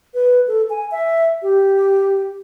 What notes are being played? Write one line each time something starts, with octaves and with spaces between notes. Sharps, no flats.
B4
A4
G#5
E5
G4